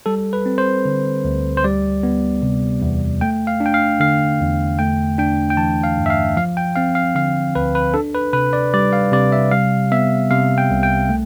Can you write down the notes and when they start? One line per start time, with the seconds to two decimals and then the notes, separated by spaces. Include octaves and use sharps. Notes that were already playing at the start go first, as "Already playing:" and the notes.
0.06 G3 A4
0.33 B4
0.46 C4
0.58 C5
0.85 D3
1.25 D2
1.57 C5
1.64 G3 D5
2.03 B3
2.42 C3
2.82 E2
3.21 A3 G5
3.47 F5
3.60 D4
3.66 G5
3.74 F5
4.00 D3 F5
4.40 E2
4.79 A3 G5
5.18 D4 G5
5.50 G5
5.57 E3 A5
5.84 F5
5.98 G2
6.06 E5
6.10 F5
6.37 F3 F5
6.57 G5
6.76 C4 F5
6.95 F5
7.15 D3 F5
7.55 D2 B4
7.75 B4
7.94 D4 A4
8.15 B4
8.33 C3 B4
8.53 D5
8.74 G3 D5
8.93 F5
9.12 C3 D5
9.32 E5
9.51 G3 F5
9.92 B3 E5
10.31 C3 F5
10.58 G5
10.71 C2
10.83 G5
11.09 A3